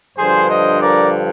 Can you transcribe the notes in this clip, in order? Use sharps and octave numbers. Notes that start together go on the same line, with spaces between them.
G2 D3 F3 G#4 C5
C5 D#5
A#4 D5